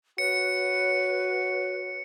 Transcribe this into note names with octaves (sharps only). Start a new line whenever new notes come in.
F#4 B4 C#5 C#7